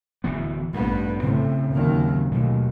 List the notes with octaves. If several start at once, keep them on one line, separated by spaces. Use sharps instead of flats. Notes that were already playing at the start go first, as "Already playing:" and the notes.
D1 E3 B3
A1 G2 B3
A2 C#3 C4
D#2 D#3 F#3
D#2 B2 F#3 A3